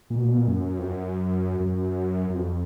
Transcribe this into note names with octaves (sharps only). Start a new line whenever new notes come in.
A#2
B2
A#2
B2
A#2
F#2
F2
F#2
F#2
F#2
F2